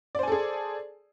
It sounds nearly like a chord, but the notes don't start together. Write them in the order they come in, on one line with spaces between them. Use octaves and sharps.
D5 C5 G#5 A4 G#4